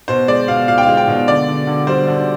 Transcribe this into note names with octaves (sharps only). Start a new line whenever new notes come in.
B2 C5
G#3 D5
B2 F5
B2 F5
G5
F5
G#3
G5
B2
D3 D5
D3
D3
G3 C5
D3